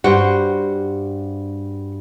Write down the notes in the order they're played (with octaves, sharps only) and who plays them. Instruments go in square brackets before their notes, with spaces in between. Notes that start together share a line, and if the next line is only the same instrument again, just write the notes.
[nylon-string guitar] G2 G4 F#5 [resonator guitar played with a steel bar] F#4 C5